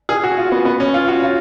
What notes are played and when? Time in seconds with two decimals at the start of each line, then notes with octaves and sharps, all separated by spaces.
0.09 G#4
0.24 F#4
0.37 F4
0.52 B3
0.65 B3
0.80 C#4
0.94 F4
1.08 F#4
1.23 F4